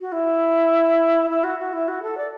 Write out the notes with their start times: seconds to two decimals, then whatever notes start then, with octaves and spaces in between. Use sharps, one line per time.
0.01 F#4
0.12 E4
1.29 E4
1.43 F#4
1.58 F#4
1.73 E4
1.88 F#4
2.02 A4
2.17 D5